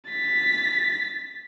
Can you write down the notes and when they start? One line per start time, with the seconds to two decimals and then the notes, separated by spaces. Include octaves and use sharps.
0.10 A6 B6